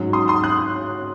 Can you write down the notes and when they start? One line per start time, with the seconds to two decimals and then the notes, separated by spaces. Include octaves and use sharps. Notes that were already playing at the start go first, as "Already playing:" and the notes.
Already playing: G#2 F#3 C#4
0.13 C6 D#6
0.28 C6 D#6
0.44 D#6 F#6